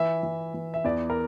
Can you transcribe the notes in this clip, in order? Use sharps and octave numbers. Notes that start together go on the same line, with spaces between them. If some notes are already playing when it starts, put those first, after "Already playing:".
Already playing: E3 E5
E3
E3
E5
E2 D5
A#4